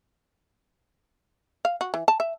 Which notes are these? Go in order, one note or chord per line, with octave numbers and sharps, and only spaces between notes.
F5
F#4
E3
A5
E5